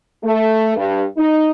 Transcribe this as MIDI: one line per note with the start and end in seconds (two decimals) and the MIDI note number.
0.24 0.75 57
0.75 1.02 43
1.17 1.49 63